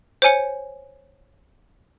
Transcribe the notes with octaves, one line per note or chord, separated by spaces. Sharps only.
C5 C#5 G#5 C#7